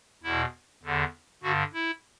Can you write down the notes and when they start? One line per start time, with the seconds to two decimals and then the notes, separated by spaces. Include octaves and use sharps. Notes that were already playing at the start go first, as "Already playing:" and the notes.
0.23 E2 B2 E4
0.83 E2 D3
1.43 G2 D3 F#4
1.73 E4